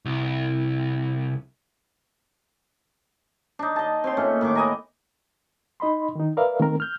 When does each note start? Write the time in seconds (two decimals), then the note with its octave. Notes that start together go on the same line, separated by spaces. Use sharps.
0.05 C2
3.59 D4 D#4
3.76 D#5 A5
4.04 C4 C#5 C6
4.17 A#2 A3 C#4
4.41 A2 D#3 C#6 D6
4.55 B3 D#5 G#5 A#5
5.80 D#4 D#5 B5 C6
6.15 D#3 D#4
6.37 A#4 B4 D5 E5 F5
6.60 D#3 A3 C4 A#4
6.80 F6 G6